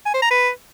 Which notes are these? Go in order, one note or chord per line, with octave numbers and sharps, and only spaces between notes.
G#5
C5
A#5
B4